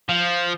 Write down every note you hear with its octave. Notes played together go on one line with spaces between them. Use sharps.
F3